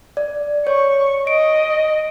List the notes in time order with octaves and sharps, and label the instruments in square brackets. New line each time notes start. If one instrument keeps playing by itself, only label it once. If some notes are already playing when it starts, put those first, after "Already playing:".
[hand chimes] D5
[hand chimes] C#5 [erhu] C#6
[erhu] D#5 [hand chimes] D7